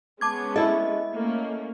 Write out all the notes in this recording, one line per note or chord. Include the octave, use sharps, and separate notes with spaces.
G#3 B3 C#4 A5 D6 G#6
E4 A4 D#5
A3 A#3 C#4